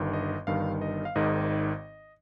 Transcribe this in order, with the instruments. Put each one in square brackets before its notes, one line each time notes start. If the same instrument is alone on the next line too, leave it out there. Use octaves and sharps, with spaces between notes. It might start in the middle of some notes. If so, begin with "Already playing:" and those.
Already playing: [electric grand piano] G1 G2 D#3
D#5
G1 G2 D#3 F5
D#5
F5
G#1 G#2 D#3 D#5